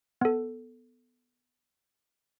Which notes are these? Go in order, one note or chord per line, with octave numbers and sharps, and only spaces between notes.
B3 A4